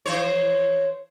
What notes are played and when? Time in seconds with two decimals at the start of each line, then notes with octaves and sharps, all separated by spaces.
0.06 E3 C5 C#5